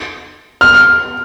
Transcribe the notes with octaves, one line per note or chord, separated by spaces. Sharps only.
F6